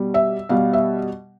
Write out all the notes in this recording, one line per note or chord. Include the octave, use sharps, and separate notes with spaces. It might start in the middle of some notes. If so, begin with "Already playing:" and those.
Already playing: B2 G3
E5
B2 G3 F5
E5